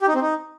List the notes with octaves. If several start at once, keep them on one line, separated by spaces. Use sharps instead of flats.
G4
D#4
C4
D#4